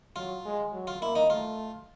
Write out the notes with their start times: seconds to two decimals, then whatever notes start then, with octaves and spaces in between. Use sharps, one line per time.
0.16 F#3 F4
0.45 G#3
0.73 F#3
0.87 F4
1.01 A#3 E4
1.15 D#4
1.30 A3 F4